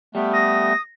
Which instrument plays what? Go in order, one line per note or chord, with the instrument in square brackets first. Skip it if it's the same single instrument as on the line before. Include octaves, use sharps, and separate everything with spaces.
[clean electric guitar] G3 [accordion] A3 B3
[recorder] D#6 [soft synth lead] A#6